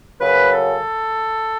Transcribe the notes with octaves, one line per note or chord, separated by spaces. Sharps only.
F#2 C#3 F#3 B4
A4